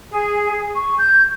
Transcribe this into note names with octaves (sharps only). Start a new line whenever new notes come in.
G#4
C#6
G6